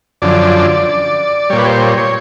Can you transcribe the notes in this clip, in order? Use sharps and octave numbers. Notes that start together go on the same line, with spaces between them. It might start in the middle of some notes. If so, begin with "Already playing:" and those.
F#2 D3 F3 D5
A#2 G3 C#5
B4
C5
C#5
C#5